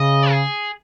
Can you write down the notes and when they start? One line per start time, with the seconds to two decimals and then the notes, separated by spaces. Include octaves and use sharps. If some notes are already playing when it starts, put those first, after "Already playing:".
Already playing: C#3 D#5
0.30 G#4